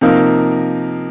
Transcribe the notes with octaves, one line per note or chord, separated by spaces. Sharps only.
C3 F3 A#3 D#4 A#4